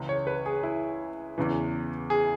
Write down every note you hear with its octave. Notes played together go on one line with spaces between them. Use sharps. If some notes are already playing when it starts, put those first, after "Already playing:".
Already playing: C#2 C#3 E3
C#5
B4
G#4
E4
E2 C#3 E3
G#4